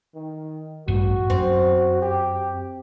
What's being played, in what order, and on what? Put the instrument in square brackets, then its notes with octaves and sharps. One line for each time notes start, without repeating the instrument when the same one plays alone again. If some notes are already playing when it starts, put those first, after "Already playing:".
[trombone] D#3
[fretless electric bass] A1 G2 [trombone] F#4
[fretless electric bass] F#2 [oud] C4
[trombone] G4